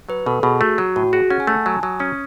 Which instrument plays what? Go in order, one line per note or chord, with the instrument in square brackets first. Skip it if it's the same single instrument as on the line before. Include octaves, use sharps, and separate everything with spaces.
[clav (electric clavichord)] F#3 [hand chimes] B4
[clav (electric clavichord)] B2 [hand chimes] A4
[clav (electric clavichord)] B2 [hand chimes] G#4
[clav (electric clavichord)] A3 [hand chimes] F#4
[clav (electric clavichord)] F#3 [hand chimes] F#4
[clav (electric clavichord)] A2 [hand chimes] F#4
[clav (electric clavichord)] F#4 [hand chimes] G#4
[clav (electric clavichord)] C#4 [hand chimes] F#5
[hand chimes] G#5
[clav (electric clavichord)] A3 [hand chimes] A5
[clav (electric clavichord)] F#3 [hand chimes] G#5
[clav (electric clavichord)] F#3 [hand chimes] D#6
[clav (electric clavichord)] C#4 [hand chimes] D#6